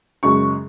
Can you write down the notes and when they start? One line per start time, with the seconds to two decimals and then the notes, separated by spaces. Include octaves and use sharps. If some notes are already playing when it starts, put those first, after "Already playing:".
0.23 F#2 C#3 G#3 C#6